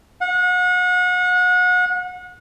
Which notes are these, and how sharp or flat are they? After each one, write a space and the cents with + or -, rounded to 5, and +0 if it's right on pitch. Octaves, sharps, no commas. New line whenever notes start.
F#5 -35